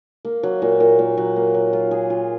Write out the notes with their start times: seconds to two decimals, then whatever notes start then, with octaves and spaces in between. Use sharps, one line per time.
0.25 A#3
0.43 F#3
0.62 A#2
0.80 A#2
0.99 A#2
1.17 F#3
1.36 A#3
1.54 F#3
1.73 F4
1.91 G#4
2.10 F4